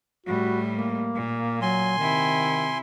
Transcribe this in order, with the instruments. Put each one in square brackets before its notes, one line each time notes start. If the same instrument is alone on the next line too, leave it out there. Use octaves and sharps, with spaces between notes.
[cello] A2 G3 [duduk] F#4
[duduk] A#3
[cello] A#2
[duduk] F#3 [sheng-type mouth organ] G#5 C6
[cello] C3 E4 [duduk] D#3